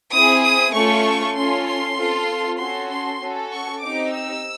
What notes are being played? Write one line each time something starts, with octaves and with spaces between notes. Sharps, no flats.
C4 E4 G#4 D#6
D#6
A3 C#4 F4 A4 C#6
C#4 F4 A4 C6
C6
C4 F4 A4
C#4 F#4 A4 C6
C6
C#4 F#4 A4
C#6
C4 D#4 G4 D6
E6